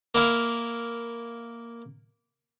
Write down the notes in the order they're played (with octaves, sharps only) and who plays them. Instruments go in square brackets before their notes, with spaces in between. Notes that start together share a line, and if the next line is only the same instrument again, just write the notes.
[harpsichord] A#3 E4 F5